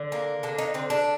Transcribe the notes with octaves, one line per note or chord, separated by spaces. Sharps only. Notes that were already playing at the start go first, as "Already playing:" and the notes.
Already playing: D3
A#3
D3 D4
D#4
D3 C4
D4